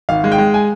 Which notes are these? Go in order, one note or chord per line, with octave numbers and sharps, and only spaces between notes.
G#1 F5
G#3
G5
G#3
G#5